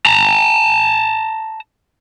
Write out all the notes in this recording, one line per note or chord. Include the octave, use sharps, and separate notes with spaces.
A5 A#5